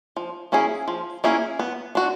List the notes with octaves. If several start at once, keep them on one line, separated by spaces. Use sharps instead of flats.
F3
A#3 C#4 E4 G#4
F3
A#3 C#4 E4 G#4
B3
D4 F#4